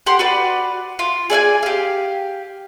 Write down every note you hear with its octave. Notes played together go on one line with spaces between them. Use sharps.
G4 F#5 C6
F#4 B4 D5
F4
G#4 D5 F5 G#5
G4 F5